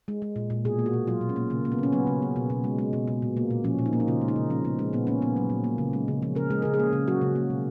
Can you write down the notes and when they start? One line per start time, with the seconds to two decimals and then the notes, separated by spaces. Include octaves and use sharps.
0.08 G#3
0.22 G#3
0.36 A#2
0.50 A#2
0.65 B2 G#4
0.79 A#3
0.86 F#4
0.94 B2
1.07 F#3 F4
1.21 B2
1.29 C#4
1.36 A#3
1.50 C#3 A#3
1.65 A#3
1.72 B3
1.79 C#3 C#4
1.93 F#3 B3
2.07 C#3
2.22 A#3
2.36 B2
2.50 B2
2.64 G#3
2.79 G#3
2.93 B2
3.08 B2
3.22 A#2
3.37 A#3
3.50 A#2
3.64 F3 C#4
3.79 A#2
3.86 D#4
3.93 A#3
4.00 D#4
4.08 C#3 F4
4.21 G#3
4.28 D#4
4.36 C#3
4.50 F3 C#4
4.65 C#3 B3
4.79 G#3 C#4
4.93 A#2 B3
5.07 A#3 C#4
5.22 A#2 B3
5.36 F#3
5.50 A#2
5.64 A#3
5.78 C#3
5.93 G#3
6.08 C#3
6.22 F3 C#4
6.35 C#3 A#4
6.50 G#3 G#4
6.62 C#3 A#4
6.74 G#4
6.79 A#3
6.93 C#3
7.08 F#3 F#4
7.21 C#3
7.35 A#3
7.50 B2